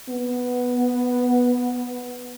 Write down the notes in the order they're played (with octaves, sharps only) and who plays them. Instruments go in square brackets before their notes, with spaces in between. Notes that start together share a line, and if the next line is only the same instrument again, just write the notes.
[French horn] B3